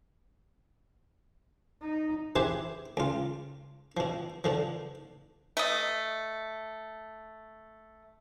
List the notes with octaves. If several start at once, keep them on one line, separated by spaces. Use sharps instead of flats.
D#4
G4 G#4 B4 C5 E5
C#2 F4
B2 F3
B2 D3 F3
A3 D#5